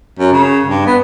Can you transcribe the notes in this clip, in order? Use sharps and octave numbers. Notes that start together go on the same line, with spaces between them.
F#2
C#3
G2
B3